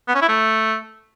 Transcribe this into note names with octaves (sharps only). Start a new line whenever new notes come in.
B3
C#4
E4
A3